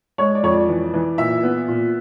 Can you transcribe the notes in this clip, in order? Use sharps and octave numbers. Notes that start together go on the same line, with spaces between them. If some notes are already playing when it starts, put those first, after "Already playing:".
G#3 C#5
D5
F2 C#5
D5
E3
E3
A#2 E5
B3
A#2